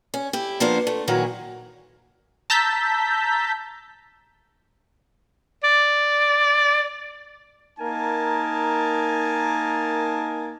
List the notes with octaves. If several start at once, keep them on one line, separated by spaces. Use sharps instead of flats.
C#4
E4 G4
F3 A#3 B3 D4 C5
A3
A#2 D#3 E3 F#3 F#4
A5 A#5 E6 G6 B6
D5
A#3 D#4 A#4 G#5 A5